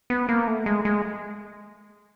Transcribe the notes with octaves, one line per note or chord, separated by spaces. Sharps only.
B3
A#3
A3
G#3
G#3